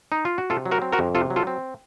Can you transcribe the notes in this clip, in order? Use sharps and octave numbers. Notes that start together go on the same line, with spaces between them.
D#4
F4
F#4
C3 F4 A4
F#3
F#4 A#4
C4
F#4 A#4
F2
C3 F4 A4
F#3
F4 A4
C4